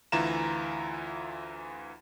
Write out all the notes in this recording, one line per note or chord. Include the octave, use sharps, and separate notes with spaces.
D2 E3 E4 F4 A#5 E7